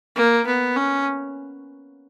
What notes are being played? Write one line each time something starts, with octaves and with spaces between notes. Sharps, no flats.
A#3
B3
C#4